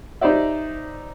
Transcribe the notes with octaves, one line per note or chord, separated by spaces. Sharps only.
D#4 G4 C5 D5 E5